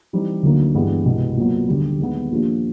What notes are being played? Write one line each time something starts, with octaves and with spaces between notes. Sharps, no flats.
E3 G3 C4 D#4
D2 D3 F#3 A#3 D#4
G2 E3 G#3 B3
C2 B2 G#3 B3
A#2 F#3 B3
D#2 D3 G3
D#2 D#3 G#3 B3
A#2 F3 A#3 D4 G4